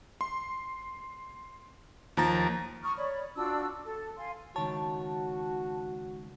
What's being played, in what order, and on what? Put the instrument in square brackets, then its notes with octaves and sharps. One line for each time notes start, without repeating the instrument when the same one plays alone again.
[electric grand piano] C6
D#2 F3 A#5 A6
[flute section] A#5 C#6 D#6 F6
C#5 D5 B5
D4 F4 F#4 E6
A4
F5 G#5 C6
[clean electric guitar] C#2 D#3 C#5 [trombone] F#4 [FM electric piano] A5